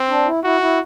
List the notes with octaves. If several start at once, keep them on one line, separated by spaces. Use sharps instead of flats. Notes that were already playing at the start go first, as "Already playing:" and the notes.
Already playing: C4
D4
E4
E4 F#4
E4